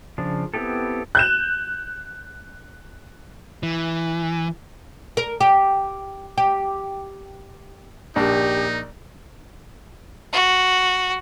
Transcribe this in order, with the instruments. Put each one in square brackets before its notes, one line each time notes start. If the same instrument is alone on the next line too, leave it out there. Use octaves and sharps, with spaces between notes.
[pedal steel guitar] C#3 F3 D4
B3 C4 E4 G4 A4
[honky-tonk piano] F#6 G6 E7
[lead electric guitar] E3
[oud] A#4
G4
G4
[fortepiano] A#1 [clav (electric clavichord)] D4 [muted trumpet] D#4 [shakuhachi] G4
[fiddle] F#4